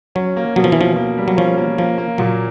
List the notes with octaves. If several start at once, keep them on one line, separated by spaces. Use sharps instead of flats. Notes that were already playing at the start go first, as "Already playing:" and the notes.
F#3 C#4
A#3
B2 F#3
F3
E3
F3 A#3
A#3
G3
F#3
F3 C#4
A#3
F3 A#3
A#3
A#2 F#3